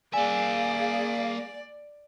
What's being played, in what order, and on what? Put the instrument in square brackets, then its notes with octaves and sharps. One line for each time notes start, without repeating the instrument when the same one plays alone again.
[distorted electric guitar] A#3 E5 [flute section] G#4 F5 [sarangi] D5 [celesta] G#5